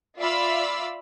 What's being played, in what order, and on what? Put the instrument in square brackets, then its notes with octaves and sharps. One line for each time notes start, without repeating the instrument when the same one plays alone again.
[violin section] F4 D5 E5 F5 B5 E6